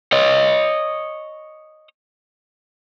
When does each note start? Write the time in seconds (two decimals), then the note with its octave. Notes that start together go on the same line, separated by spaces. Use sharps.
0.12 C#5 D#5